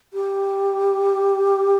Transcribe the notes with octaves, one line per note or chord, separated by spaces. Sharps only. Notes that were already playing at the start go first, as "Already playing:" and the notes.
G4